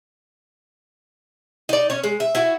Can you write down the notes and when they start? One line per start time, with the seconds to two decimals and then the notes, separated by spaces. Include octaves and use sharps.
1.69 D#4 D5
1.90 C#4 C#5
2.03 G#3
2.20 E5
2.35 E4 F#4